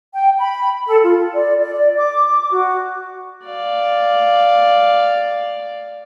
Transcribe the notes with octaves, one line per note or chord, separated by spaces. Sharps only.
G5
B5
A4
F4
D5
D5
D6
F#4
D5 F5